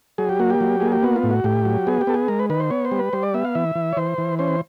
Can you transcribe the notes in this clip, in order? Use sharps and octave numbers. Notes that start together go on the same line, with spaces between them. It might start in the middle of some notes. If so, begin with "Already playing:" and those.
F#3 G#4
G4
A#3 F#4
G4
F#3
A#3 G#4
G4
B3 F#4
F4
A2
F#4
A2 G4
F#3
B3 G#4
G4
B3 A4
G#4
G#3 A#4
B4
D#3 B4
C5
B3 C#5
C5
G3
B4
G3 C5
D5
B3 E5
F5
E3 E5
E3
C#5
E3 C5
E3
C#4 C5